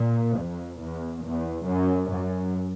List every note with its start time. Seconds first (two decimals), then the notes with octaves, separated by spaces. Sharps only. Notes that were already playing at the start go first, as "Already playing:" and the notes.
Already playing: A#2
0.40 F2
0.82 E2
1.26 E2
1.69 F#2
2.12 F#2